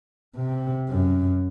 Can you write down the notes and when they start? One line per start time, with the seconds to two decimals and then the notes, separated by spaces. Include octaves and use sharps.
0.37 C3
0.89 F#2